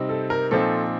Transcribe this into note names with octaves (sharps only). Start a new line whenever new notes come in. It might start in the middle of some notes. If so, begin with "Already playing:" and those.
Already playing: C3 G3 C4 D#4
A4
A#4
A#2 F3 C4 D#4 A4